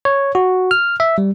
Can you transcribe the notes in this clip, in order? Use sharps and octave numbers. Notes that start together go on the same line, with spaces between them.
C#5
F#4
F6
E5
G3